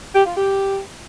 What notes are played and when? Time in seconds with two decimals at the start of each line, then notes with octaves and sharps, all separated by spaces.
0.14 G4
0.25 F4
0.36 G4